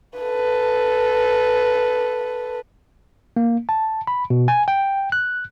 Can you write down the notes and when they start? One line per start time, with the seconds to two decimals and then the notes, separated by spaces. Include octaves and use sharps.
0.19 A4 B4
3.37 A#3
3.69 A5
4.07 B5
4.30 B2
4.48 G#5
4.68 G5
5.12 F#6